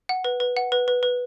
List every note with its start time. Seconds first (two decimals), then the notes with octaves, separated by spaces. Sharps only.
0.09 F#5
0.24 B4
0.40 B4
0.57 F#5
0.72 B4
0.88 B4
1.03 B4